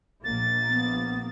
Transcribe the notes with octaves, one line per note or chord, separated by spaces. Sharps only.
A#1 A#3 A6
B3